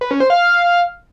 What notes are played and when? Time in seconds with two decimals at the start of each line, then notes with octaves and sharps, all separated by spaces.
0.01 B4
0.11 C#4
0.20 C5
0.30 F5